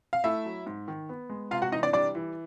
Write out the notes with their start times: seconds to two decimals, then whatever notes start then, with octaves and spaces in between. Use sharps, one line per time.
0.13 F5
0.24 A3 E4 E5
0.45 F#3
0.67 G#2
0.88 D#3
1.09 B3
1.30 G#3
1.51 C3 F4 F5
1.62 F#4 F#5
1.72 E3 D#4 D#5
1.83 D4 D5
1.93 G3 D4 D5
2.15 E3